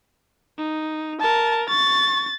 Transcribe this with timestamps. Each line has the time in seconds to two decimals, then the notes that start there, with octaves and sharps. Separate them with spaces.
0.58 D#4
1.21 A#4 A5
1.69 C#6 A6